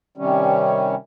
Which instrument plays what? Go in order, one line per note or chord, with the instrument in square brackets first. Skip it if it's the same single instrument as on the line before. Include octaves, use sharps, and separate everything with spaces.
[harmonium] C3 D#3 G3 C#4